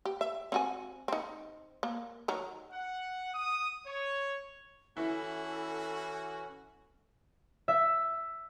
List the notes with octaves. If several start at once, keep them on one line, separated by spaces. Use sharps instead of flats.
G4
E5
C4 F#4 G#5
C4 D#4
A#3
D#3 F#3 A#5
F#5
D#6
C#5
E3 C#4 E4 F#4 A4
E5